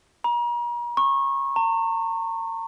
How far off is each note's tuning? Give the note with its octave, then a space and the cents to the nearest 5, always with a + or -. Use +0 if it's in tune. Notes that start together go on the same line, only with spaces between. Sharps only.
A#5 +40
C#6 -25
A#5 -40